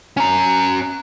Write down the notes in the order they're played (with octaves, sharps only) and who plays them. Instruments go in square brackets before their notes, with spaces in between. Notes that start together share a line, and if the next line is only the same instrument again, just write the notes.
[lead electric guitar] C#4 A#5